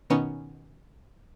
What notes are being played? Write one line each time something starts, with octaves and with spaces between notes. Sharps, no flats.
B2 D#3 B3 C#4 D#4